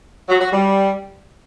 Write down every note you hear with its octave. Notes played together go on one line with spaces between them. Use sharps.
F#3
F#4
G3